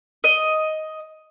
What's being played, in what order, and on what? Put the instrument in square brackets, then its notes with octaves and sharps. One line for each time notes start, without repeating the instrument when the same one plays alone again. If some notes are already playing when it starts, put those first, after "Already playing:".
[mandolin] D#5